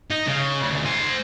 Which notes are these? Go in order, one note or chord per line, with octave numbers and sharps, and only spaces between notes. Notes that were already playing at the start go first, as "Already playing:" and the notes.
D#4
C#3
D2 C#3
C5 G#5